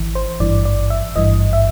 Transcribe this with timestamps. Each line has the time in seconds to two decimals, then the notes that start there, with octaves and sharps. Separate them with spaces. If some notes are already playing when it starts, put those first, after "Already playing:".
Already playing: G#1 E3
0.15 C5
0.40 G#1 G2 E3 D5
0.65 D5
0.90 E5
1.16 G#1 G2 E3 D#5
1.53 E5